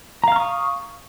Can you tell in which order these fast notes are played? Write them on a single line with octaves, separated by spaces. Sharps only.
A#5 F5 F6 C#6 D#6